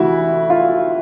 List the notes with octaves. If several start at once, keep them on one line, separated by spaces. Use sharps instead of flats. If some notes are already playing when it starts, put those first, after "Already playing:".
Already playing: D2 C3 E3 E4 F#4
F4